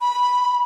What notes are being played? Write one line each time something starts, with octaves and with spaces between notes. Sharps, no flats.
B5